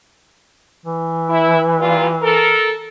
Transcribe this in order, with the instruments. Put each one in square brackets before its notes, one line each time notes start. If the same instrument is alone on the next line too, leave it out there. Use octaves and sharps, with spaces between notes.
[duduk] E3
[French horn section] E4
G2 A#2 F4
A4 A#4